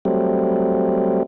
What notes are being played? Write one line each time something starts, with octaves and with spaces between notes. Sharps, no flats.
F#3 G3 A3 C4